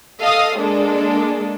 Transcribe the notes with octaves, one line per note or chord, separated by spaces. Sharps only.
A4 D#5 F5 D#6
G#3 A#3 D4 A4